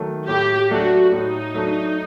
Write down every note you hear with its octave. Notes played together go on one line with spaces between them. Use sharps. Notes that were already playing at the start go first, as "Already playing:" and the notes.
Already playing: D#3 F#3 A3
A2 G4
F#3 A3 D4 F#4
A2 D#4
F#3 A3 D4